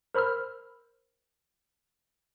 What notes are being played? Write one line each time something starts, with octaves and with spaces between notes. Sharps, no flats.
A#4 C5 B5 E6 F6